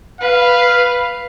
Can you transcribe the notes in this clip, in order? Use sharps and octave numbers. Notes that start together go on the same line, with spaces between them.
B4 F5